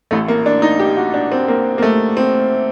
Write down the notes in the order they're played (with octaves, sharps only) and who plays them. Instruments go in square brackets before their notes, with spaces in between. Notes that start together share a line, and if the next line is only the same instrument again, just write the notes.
[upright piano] A1 A2 A3
A#3
D4
D#4
G4
F#4
D4
C4
A#3
A#3
A3
C4